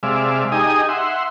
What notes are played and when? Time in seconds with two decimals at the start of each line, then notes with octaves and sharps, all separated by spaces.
0.03 C3 G#3 D5 E5 F5
0.52 D#4 G4 G#4 D#5 G#5 D#6
0.89 E5 F#5 C6